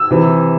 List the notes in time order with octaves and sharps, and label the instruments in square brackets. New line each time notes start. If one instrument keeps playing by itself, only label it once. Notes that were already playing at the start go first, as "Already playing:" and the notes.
Already playing: [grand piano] E6
C3 E3